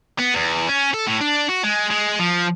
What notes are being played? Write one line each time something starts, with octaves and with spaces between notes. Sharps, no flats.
B3
E2
C#4
A4
A2
D4
F#4
G#3
G#3
F3